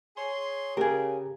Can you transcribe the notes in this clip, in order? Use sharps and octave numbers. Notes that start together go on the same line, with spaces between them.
G#4 C#5 C6
C#3 G4 G#4 A#4